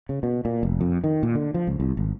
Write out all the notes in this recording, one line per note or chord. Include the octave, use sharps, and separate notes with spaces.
C#3
B2
A#2
F1
F2
D#3
A#2
D3
F3
C#2
C2
G#1